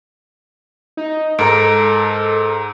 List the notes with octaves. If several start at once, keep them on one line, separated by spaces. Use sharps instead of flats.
D#4
G#2 A4 A#4 A#5 D7